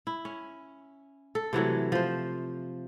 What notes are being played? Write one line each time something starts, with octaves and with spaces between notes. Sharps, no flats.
E4
C#4
A4
C3 E3 F#3 A3
F3 C5